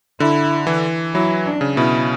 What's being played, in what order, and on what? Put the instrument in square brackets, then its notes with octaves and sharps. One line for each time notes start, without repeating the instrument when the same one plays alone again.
[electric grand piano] D3 [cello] E4
[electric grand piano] E3
[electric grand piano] F#3 [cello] E4
[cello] D4
[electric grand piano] C#3
[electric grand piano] B2 [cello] E4